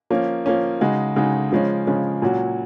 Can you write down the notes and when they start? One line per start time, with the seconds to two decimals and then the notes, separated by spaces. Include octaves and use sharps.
0.10 F3 A#3 C#4
0.46 F3 A#3 C#4
0.81 C#3 G#3 D#4 F#4
1.16 C#3 G#3 D#4 F#4
1.52 C#3 F3 G#3 C#4
1.87 C#3 F3 G#3 C#4
2.22 A#2 F#3 C#4 F#4